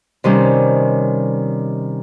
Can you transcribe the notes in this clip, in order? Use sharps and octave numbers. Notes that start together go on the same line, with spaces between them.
C3 D#3 G3 C#4